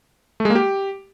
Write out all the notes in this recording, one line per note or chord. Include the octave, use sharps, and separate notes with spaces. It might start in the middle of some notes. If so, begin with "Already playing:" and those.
A3
G#3
A#3
G4